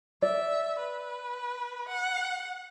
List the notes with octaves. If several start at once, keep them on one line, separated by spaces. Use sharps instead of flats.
D5 E5
B4
F#5